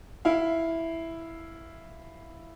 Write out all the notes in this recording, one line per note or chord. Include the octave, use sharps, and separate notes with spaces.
E4 F5